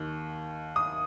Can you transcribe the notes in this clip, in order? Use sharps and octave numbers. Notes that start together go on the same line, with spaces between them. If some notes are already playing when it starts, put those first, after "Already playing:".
Already playing: D#2 D#3
D#6